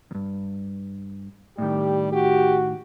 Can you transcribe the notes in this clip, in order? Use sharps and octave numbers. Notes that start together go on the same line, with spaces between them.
E2 G2
A2 D#3 G3 G4
F#4 G4